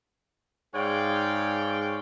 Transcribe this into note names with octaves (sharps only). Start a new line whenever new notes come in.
G#2 G#4 C#5 D5 F5 G5